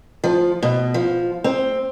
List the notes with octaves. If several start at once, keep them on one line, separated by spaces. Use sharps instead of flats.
F3
B2
F3
C4